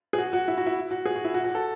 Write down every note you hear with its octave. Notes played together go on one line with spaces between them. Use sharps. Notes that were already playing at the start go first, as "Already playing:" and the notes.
G#4
F#4
F#4
E4
F#4
E4
F#4
G#4
F#4
E4
F#4
F#4
A4